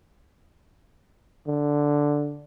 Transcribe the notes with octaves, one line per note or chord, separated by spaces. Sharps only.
D3